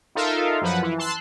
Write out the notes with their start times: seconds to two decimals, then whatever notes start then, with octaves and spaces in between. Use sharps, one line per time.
0.15 D#4 F4 A4 A#4 E5 F5
0.62 F#2 F3 B4 F#5
0.83 E3
0.98 A5 C6 E6 F#6